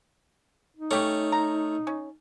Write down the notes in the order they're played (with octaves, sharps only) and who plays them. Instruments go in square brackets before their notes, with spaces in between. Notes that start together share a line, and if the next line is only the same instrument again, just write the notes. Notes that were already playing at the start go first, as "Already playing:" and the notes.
[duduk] D#4
[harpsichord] A3 C#4 [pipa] G4 C#5
[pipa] A#5
C#4